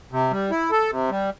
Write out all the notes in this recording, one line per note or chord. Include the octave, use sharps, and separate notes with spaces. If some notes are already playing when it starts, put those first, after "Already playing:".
C3
G3
E4
A4
C3
G3